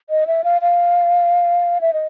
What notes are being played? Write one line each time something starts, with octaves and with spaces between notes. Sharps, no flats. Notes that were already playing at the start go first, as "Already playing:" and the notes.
D#5
E5
F5
F5
E5
D#5